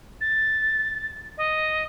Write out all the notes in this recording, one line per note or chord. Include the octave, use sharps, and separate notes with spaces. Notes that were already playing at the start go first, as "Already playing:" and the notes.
A6
D#5